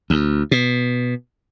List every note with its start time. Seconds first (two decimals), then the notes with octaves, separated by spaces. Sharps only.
0.10 D2
0.51 B2